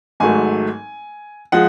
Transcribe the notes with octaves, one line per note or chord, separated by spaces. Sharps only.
G#1 G#2 F#3 A3 G#5
F3 G#3 F#5